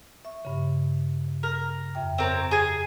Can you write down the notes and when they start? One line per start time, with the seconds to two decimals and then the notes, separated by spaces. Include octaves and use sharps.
0.25 E5 C#6
0.45 G2 C#3
1.43 A#4
1.95 F2 E5 G5
2.18 C4 A#4 C#5
2.51 G#4 G#5